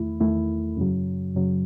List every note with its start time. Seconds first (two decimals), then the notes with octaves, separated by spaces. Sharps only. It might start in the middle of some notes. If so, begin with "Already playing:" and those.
Already playing: E2 D#3 A3 E4
0.20 E2 D#3 A3 E4
0.77 F#2 C#3 F#3
1.35 F#2 C#3 F#3